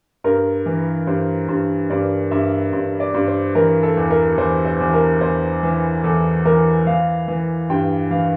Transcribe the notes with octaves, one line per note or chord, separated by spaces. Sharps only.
G2 A#4
E3
G2 C5
G2
G2 D5
G2 E5
G2
D5
G2
C5
E3 A#4
A4
E2
A#4
E2 C5
C5
E2
A#4
E2 C5
E3
E2 A4
E3 A#4
E3 F5
E3
G2 G5
E3 F5